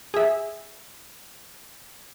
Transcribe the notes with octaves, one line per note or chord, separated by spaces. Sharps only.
G#4 E5